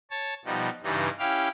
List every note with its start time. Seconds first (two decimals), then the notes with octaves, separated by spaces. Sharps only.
0.11 C#5 A5
0.45 B2 F3 G3 D#4
0.83 G2 C#3 E3 G3 D#4
1.19 C#4 E4 G4 F5 G5